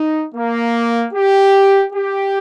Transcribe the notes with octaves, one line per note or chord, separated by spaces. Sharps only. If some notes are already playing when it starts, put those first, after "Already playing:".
Already playing: D#4
A#3
G4
G4